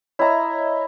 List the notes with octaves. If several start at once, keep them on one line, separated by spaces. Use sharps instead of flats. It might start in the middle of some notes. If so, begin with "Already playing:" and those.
E4 C#5 D#5 E5 A#5